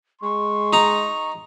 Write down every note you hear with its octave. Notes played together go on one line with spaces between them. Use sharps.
G#3 C6 C#6
D#4 A#5